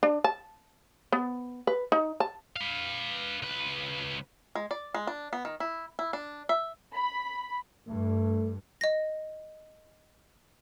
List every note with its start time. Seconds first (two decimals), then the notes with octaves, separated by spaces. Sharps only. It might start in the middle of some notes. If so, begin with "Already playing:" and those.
0.03 D4
0.24 A5
1.12 B3
1.67 B4
1.92 D#4
2.20 A5
2.56 B4 F5
3.42 C#2 B4
4.55 G#3
4.71 D5
4.94 G#3
5.07 D4
5.33 B3
5.45 D#3
5.60 E4
5.99 E4
6.13 D4
6.49 E5
6.95 B5
7.87 G2 A3
8.81 D#5 A#6